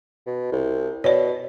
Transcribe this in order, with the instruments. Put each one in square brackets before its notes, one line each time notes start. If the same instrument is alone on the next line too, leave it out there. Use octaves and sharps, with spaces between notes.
[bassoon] B2
C2
[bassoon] B2 [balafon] C#5 D5